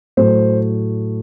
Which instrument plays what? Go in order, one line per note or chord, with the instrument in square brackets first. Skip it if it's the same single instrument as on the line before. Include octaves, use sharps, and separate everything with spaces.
[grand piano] A2 F#3 A3 C5